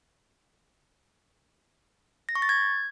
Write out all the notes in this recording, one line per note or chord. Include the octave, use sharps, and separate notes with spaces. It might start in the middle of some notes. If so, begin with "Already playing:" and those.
A#6
C#6
A6
G#6